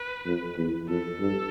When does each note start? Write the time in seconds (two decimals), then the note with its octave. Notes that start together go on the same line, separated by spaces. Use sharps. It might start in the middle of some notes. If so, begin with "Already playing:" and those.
Already playing: B4
0.26 F2
0.57 E2
0.89 F2 A4
1.20 G2